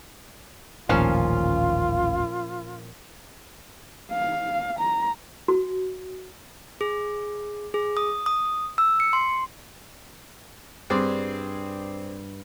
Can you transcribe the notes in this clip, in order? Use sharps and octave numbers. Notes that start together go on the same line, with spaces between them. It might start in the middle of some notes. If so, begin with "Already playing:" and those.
D#1 A1 D#2 A#2 F3 C#4 F4 F5
F5
A#5
F#4
G#4
G#4
D#6
D#6
E6
C#7
C6
G2 C4 G#4 D5